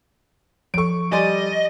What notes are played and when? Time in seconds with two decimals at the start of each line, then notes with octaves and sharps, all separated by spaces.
0.74 F3 A4 C#6 D7
1.12 G3 D5 D#5 G#5 C6 A6